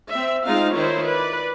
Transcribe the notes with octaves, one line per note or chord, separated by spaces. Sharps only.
C4 E5
G#3 C4 D#4 F4 F5
D#3 E4 F4 C5 C#5
B4 D5